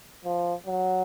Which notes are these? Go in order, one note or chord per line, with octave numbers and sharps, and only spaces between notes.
F3
F#3